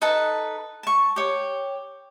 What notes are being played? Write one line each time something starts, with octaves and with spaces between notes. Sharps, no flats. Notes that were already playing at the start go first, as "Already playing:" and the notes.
D#4 A4 B4 A5
A5 C#6
G4 C#5